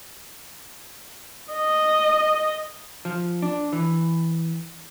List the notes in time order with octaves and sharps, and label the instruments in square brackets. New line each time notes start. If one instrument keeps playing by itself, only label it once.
[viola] D#5
[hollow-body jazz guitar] F3
D4
E3